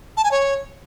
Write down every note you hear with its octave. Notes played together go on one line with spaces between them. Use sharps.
A5
G#5
C#5